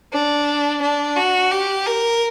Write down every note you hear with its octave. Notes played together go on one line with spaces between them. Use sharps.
D4
D4
F#4
G4
A#4